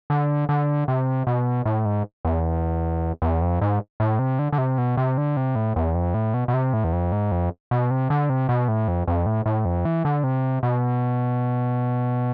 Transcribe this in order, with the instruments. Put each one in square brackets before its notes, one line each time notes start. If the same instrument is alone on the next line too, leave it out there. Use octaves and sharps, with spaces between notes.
[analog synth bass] D3
D3
C3
B2
A2
G#2
E2
E2
F2
G#2
A2
C3
D3
D3
C3
B2
C3
D3
C3
A2
E2
F2
A2
B2
B2
C3
A2
E2
F2
G#2
F2
B2
C3
D3
C3
B2
A2
F2
F2
A2
A2
F2
E3
D3
C3
B2